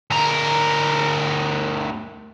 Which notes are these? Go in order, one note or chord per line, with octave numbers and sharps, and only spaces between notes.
D2 A#4